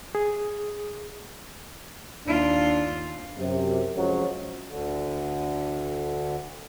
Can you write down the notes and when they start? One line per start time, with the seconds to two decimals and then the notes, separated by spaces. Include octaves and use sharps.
0.15 G#4
2.27 D#2 D4 F4
3.38 F#2 C3
3.95 F2 F3 F#3 G#3 C#4
4.69 D2 D3